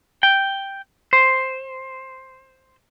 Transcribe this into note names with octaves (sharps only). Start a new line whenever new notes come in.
G5
C5